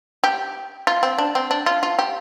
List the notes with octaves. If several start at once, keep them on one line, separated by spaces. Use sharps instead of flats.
G4
F4
C4
D4
C4
D4
F4
F4
G4